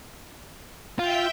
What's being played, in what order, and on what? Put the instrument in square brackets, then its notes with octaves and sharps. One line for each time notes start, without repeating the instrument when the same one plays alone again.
[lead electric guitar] F4 [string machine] E5 G5 G6